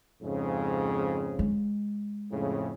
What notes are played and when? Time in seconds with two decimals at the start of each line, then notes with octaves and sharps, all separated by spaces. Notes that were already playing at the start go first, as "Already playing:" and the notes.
0.22 F2 G#2 C#3
1.39 G#3
2.31 F2 A2 C#3